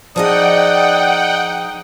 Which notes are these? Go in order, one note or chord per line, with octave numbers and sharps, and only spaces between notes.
F3 D#4 G#4 D5 D#5 F#5 G5 D#6